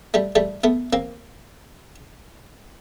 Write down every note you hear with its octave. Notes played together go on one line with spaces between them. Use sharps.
G3 A3
G3 A3
A3 B3
A#3 C4